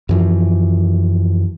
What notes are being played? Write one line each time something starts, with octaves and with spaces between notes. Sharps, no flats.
F#2 E3 F3